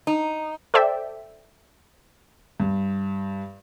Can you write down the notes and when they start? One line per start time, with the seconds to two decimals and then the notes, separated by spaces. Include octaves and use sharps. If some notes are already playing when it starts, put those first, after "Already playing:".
0.07 D#4
0.74 A4 C5 D5 E5 G5
2.60 G2